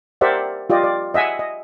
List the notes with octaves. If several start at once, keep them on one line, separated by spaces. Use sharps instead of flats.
G4 A#4 C5 D5 E5 F#5
F4 G4 D5 D#5
D5
D#5 E5 F#5 G#5
D#5